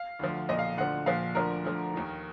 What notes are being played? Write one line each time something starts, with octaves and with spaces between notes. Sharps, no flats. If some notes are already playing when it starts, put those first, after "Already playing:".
Already playing: F5
D2 D3 F3
B1 A#2 F3 D#5
F5
D2 D3 F3 F#5
A#1 A#2 F3 F5
D2 D3 F3 A#4
D2 D3 F3
D#2 D#3